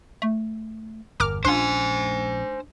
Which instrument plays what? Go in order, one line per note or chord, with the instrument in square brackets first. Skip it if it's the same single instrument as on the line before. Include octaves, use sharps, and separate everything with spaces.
[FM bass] A3
[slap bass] G1 E2 [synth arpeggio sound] A#4 D6 F6
[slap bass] A#1 C#4 [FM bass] D4 [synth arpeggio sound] F4 C6 [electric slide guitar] C5 G#5